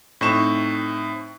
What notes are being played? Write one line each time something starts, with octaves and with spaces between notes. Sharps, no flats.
A2 C4 D#4 C#6 E7